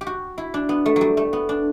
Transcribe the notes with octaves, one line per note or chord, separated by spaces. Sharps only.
G4
F#4
E4
D4
B3
A3
F#3 G3
A3
B3
D4